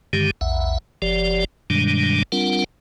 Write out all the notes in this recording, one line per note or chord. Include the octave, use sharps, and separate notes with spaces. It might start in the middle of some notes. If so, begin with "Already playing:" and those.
G2 D3 D#3 G#3 G4
A#1 E2 E5 F#5
F#1 F3 G4 D5
G2 B2 D#3 G3 G#3 D4
G3 C4 D4 F4 A#4 F#5